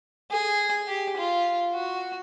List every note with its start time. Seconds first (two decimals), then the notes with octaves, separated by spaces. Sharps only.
0.31 G#4
0.88 G4
1.17 F4
1.74 F#4